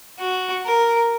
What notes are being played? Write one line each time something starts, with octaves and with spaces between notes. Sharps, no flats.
F#4
A#4